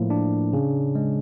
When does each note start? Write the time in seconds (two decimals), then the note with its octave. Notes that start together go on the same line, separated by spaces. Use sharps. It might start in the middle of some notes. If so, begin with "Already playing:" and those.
Already playing: A2 F3 A#3
0.10 D4
0.53 C#3
0.95 G#3